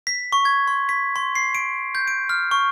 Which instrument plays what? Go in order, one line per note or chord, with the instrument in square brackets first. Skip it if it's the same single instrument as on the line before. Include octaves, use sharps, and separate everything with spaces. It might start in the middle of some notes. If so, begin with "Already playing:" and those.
[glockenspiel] B6
C#6
G#6
C6
B6
C6
C7
D7
G6
D7
F6
C#6